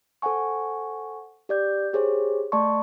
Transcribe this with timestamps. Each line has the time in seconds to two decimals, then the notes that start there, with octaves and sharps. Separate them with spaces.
0.22 A4 C5 F#5 G#5 C#6
1.49 G4 D5 G6
1.93 G4 G#4 C5 C#5
2.52 A3 D5 A5 C6 C#6